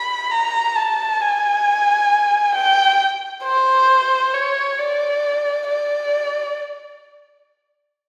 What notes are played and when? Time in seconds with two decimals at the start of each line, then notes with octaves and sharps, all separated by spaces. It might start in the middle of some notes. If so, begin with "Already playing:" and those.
Already playing: B5
0.32 A#5
0.76 A5
1.21 G#5
2.55 G5
3.44 C5
4.34 C#5
4.79 D5
5.68 D5